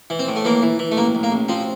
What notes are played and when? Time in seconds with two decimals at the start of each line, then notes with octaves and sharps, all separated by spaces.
0.10 E3
0.19 C4
0.28 A2
0.36 A3
0.45 E3 A#3
0.63 E3
0.79 E3
0.91 A3
0.97 A1 A#3
1.15 A1
1.23 A#3
1.32 A1
1.49 F3 C4